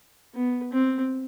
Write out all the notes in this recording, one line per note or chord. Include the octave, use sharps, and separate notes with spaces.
B3
C4